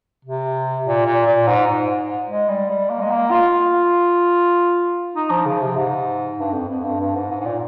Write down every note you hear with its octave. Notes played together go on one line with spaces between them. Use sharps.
C3
A#2
A#2
A#2
G#2
G#2
G#3
G3
G3
A#3
G#3
A#3
F4
D#4
F3
C#3
C3
G#2
G2
F2
F2
G2
G2
G#2
G#2
G#2
A#2